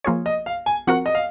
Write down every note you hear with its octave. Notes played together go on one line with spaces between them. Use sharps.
F3 A#3 F4 G#4 C#5
D#5
F5
G#5
F3 C4 F#4 A#4 F#5
D#5
F5